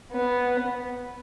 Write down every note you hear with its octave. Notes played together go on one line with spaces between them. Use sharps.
B3